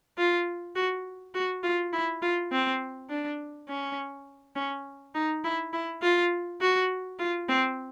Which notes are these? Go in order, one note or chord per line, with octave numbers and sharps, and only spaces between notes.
F4
F#4
F#4
F4
E4
F4
C4
D4
C#4
C#4
D#4
E4
E4
F4
F#4
F4
C4